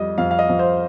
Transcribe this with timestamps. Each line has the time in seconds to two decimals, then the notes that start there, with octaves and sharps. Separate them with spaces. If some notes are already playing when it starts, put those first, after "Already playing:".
Already playing: F2 G3 D#5
0.18 F2 F5
0.31 F5
0.39 D#5
0.49 F2
0.59 C5